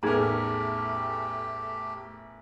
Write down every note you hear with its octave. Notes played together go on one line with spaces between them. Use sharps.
A1 E2 A3 D#4 G4 G#4 A#4 A#5